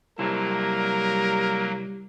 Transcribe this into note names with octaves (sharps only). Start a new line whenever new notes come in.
C3 F#3 G3 A#3 E4 A#4 A5